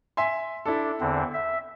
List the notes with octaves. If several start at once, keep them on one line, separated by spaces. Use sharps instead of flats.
E5 G#5 C6
D4 E4 A4
E2 D3 C4
E5